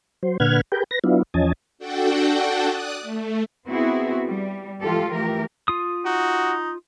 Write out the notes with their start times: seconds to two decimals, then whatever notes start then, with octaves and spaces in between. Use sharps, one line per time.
0.23 F#3 C5
0.40 A#2 D3 B4 F#5 F6 G#6
0.72 G4 G#4 A#4 B4 G5
0.91 B4 A#6
1.04 F#3 B3 D4 E4 F4
1.34 E2 F3 C#4 D#5 G#5 A5
1.79 D4 F#4 A4 F#5 G5
2.68 D5 D#6 F#6
3.00 A3
3.68 B3 C4 E4 F#4 G#4
4.26 G3
4.81 E3 F3 G#3 F4 G4 A4
5.10 E3 A3 G4 A#4
5.68 F4 D#6
6.05 D#4 F#4